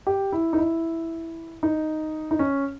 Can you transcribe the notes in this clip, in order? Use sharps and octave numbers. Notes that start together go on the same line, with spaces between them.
G4
E4
D#4
E4
D#4
D#4
C#4